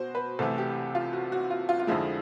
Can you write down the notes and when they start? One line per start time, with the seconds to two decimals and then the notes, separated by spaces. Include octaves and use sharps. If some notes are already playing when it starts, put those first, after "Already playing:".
Already playing: B2 F#4 C5
0.15 B4
0.39 C2 C3 E3 A3 A4
0.58 G4
0.95 F4
1.13 F#4
1.32 F#4
1.50 F4
1.69 F4
1.80 F4
1.87 F2 D3 F3 G#3 E4